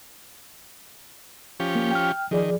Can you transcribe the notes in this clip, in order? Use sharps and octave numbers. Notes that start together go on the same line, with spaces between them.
F3 C#4 G4
A#3
G5 F6
D#3 F3 G#4 D5